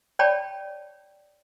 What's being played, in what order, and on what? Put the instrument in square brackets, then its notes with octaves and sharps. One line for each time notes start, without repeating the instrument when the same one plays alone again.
[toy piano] C#5 D5 G5 A5 B5